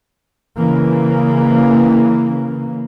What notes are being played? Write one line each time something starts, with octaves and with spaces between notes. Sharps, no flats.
C#3 E3 A#3